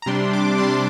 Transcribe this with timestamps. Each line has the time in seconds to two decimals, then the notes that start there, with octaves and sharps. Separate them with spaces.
0.02 A#5
0.06 C3 G3 D4 C6
0.33 D6
0.58 C3 G3 D4 C6